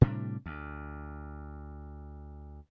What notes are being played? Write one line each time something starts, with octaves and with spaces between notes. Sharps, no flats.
A2 C3 G3 D4
D2